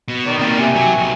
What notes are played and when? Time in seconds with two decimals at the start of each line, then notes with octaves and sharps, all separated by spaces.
0.08 B2
0.25 D#3 D5
0.39 C3 A#3
0.60 G4 E5 G#5
0.76 F#3
0.98 B1